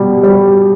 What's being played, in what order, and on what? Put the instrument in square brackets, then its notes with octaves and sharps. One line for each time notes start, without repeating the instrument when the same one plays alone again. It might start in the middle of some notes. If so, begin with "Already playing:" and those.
Already playing: [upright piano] B2 G3
G3